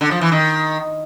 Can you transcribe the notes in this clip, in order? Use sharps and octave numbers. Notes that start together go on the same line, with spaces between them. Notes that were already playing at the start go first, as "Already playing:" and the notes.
D3
F3
E3
D#3